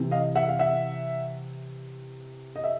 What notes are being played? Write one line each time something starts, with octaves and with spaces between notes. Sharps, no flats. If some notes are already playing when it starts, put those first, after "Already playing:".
Already playing: C3 E3
D#5 F5
E5 F#5
F5
E5 F#5
D#5
E5